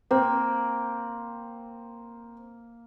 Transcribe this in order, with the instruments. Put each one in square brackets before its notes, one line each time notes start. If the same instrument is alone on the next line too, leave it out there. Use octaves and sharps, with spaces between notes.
[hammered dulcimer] A#3 [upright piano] C4